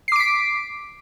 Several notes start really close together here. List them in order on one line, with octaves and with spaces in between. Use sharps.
C7 D6 D7 B6